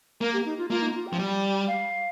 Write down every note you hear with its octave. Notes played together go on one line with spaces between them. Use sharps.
A#3 A#4
G4
D#4
F4
A#3 F4
D#4
F4
G5
F3
G3
G5
F5